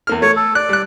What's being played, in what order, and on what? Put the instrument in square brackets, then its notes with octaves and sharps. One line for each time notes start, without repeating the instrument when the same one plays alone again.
[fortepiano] E2 A#3 F6
[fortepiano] A3 [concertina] C#5
[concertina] A4
[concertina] D5 [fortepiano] F#6
[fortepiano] G3 F#6